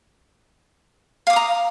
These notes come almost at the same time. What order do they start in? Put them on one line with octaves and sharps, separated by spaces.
F5 D6 D#6 A#5